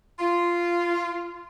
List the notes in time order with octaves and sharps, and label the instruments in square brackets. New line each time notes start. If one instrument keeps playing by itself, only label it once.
[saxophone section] F4